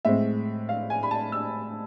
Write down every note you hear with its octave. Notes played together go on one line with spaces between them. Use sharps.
A2 G#3 C4 E5
F5
G#5
B5
A5
E6